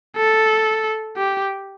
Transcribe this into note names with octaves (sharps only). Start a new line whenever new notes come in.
A4
G4